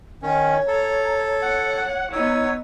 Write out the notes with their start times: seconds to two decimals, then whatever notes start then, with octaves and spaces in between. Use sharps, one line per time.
0.22 D#3 C#4 C#5
0.68 A4 A#5
1.42 F#5
2.12 B3 D#4 C#5 E6